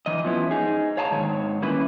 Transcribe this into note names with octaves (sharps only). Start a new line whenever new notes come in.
E3 D#5
F3 B3 C#4 E4
D#4 G#4
C#5 F5 A5 A#5
G#2 D#3 C#5
G3 A#3 C#4 E4 B4